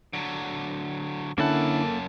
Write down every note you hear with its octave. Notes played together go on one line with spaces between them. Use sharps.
D3 F#3
F#2 D3 A#3 C#4 E4 A4 F#5 A5